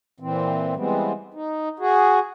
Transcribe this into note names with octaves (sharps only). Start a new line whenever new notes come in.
A#2 E3 C4
E3 G3 G#3 B3 C4
D#4
F#4 G#4